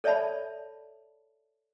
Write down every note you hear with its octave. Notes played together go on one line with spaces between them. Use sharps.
A4 C#5 D5 E5 A5 B5